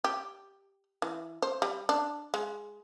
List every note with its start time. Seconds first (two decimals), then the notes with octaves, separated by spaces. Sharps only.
0.04 G4
1.02 E3
1.42 C5
1.62 G3
1.89 D4
2.34 G#3